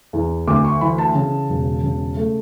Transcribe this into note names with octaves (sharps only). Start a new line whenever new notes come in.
E2
D2 D6
C#6
E3 B5
A5
C#3
E1
C#3
A3